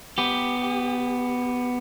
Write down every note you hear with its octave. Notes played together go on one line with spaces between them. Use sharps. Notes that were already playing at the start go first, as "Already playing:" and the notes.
B3 G4